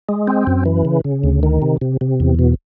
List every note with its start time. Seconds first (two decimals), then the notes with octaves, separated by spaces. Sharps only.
0.09 G#3
0.27 C4
0.47 F#2
0.66 E3
0.85 C#3
1.04 C#3
1.23 D2
1.43 D#3
1.62 C3
1.81 C3
2.01 C3
2.20 E2
2.39 B2